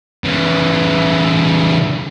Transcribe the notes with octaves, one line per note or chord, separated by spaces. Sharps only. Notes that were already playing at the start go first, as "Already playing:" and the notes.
C#3 E3